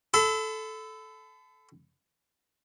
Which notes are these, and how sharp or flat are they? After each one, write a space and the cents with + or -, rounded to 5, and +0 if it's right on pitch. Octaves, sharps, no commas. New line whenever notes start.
A4 -10 B5 +40